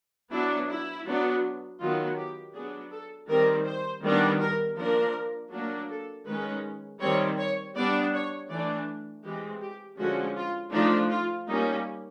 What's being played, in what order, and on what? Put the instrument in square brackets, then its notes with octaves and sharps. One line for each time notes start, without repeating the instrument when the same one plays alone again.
[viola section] F#3 B3 D4 E4
E4
F#3 B3 D4
D#3 F#3 B3 F4
G4
F#3 B3 D4 G#4
A4
D#3 G3 C4 A#4
C5
D#3 G3 B3 D4
A#4
F3 A#3 D4 A#4
F#3 A#3 D4
A4
D#3 G#3 C#4 B4
D#3 G3 C4 C#5
C#5
G3 B3 D4 D5
C#5
E3 A3 D4 D5
E3 G#3 C4 G4
G4
D3 F3 G#3 C#4 F#4
F4
F3 A3 D4 D#4
F4
G3 A#3 C#4 D#4